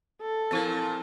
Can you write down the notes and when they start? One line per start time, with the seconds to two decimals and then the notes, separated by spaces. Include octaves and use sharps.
0.21 A4
0.51 A#2 F3 C4 E4 A#4